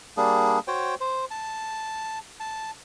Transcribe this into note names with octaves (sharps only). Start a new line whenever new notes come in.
G3 A#3 D4 G#4
F#4 C5 C#5 G5
C5
A5
A5